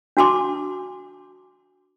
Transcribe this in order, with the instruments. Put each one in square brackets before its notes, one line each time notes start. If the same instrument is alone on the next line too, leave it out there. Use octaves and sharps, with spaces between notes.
[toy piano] D4 F#4 A5 C6 D6